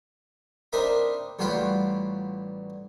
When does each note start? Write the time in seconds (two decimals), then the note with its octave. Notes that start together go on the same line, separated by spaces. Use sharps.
0.73 C4 D4 D#4 A#4 E5 B5
1.39 A1 G3 F4 F#4 G5 B5